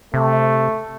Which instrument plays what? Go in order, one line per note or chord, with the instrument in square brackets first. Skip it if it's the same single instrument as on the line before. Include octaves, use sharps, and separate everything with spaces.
[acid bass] C3 [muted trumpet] A3